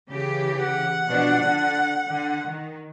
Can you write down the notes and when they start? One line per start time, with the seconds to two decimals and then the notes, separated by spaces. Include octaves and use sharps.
0.10 C#3 E3 G4
0.61 F#5
1.08 B2 F3 D4
1.40 D3
2.09 D3
2.46 D#3